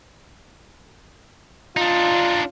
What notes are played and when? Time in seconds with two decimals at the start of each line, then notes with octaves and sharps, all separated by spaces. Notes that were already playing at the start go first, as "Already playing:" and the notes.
1.77 D4 D#4 F4